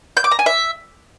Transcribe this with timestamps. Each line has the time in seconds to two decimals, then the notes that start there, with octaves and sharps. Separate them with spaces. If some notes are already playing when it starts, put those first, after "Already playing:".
0.17 G6
0.24 D6
0.31 A#5
0.39 G#5
0.46 E5